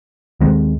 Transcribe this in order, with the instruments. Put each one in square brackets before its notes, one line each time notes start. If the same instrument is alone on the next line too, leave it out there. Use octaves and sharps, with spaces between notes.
[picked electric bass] D#2 D#3 G#3 C4